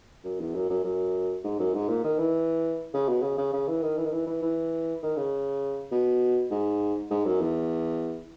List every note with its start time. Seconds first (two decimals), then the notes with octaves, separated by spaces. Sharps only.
0.24 F#2
0.40 E2
0.54 F#2
0.69 F#2
0.84 F#2
1.44 G#2
1.59 F#2
1.74 G#2
1.89 A#2
2.04 D#3
2.18 E3
2.93 C#3
3.08 B2
3.23 C#3
3.38 C#3
3.53 C#3
3.68 E3
3.83 D#3
3.98 E3
4.05 D#3
4.13 E3
4.27 E3
4.42 E3
5.02 D#3
5.16 C#3
5.91 B2
6.50 G#2
7.10 G#2
7.25 F#2
7.40 E2